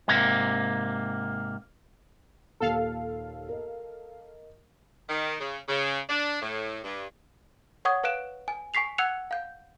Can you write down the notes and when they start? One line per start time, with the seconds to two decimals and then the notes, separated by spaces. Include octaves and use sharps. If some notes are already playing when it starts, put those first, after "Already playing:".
0.08 G#2 C3 A#3
2.60 D#2 A#2 A4 F5
3.49 A#4 D#5
5.09 D#3
5.41 C#3
5.69 C#3
6.10 D4
6.42 A2
6.84 G2
7.85 C#5 F#5 C#6 D#6 G#6
8.04 B4 F5 F#6 D7 E7
8.48 G#5
8.74 G#5 C#6 B6 C7 F7
8.98 F#5 E6 F#6 G#6 C#7 F7
9.31 F5 G6